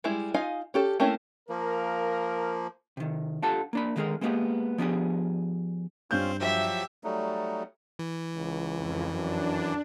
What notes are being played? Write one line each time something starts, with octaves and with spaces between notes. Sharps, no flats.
G3 G#3 E4
D#4 F4 D#5 F5 G#5
C#4 G4 A4
A3 A#3 C4 C#4 E4
F3 A#3 A#4
C3 D#3
D4 F4 G4 A4 F#5 A5
A#3 D4 B5
D3 D#3 G#3 F#4 G#4 A#4
G#3 A#3 B3 C#4 G4 G#4
F3 B3 D4 G4 G#4
G2 C4 C#4 F4 C5 G6
F3 F#3 G4 E5
F#3 G3 A3 D#4
E3
C#2
F2
F#2 D4